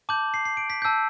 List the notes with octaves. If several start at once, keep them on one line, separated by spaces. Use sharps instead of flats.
A5 D6 G6 F#7
C7
C7
D7
B6
A5 E6 G6